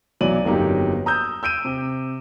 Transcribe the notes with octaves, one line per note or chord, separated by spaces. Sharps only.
B1 E3 F#3 D5 D#7 F#7
G1 F2 F#3 A#3 D#4 G4
A#5 D#6 E6 G6
E6 G6 D7 D#7
C3